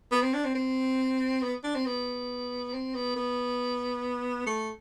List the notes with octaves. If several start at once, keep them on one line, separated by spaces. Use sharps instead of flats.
B3
C4
D4
C4
C4
B3
D4
C4
B3
C4
B3
B3
A3